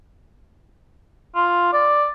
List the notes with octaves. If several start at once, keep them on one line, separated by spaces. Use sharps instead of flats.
F4
D5